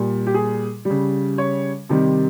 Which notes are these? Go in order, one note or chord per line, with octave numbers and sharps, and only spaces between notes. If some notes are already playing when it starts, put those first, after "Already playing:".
Already playing: A#2 G3
G4
G#4
G3
C#3
C#5
C3 D#3 G3